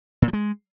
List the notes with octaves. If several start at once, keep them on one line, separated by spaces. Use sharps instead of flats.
A#2
F3
G#3